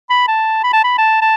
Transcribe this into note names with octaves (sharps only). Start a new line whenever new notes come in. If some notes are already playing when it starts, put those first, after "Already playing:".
B5
A5
B5
A5
B5
A5
A5